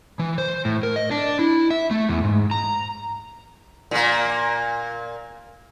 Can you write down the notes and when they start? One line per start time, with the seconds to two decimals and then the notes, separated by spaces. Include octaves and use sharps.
0.19 E3
0.38 C5
0.65 A2
0.83 A#4
0.96 D#5
1.11 D4
1.39 E4
1.70 E5
1.91 A3
2.08 E2
2.24 G#2
2.51 A#5
3.91 A#2 A#3